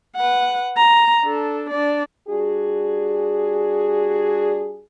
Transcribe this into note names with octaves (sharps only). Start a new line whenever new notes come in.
B4 F#5
A#5
D4 A4
D4 D5
G3 D4 F#4 G#4